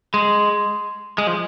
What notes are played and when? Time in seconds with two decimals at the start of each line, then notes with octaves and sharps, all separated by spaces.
0.14 G#3
1.18 G#3
1.27 F3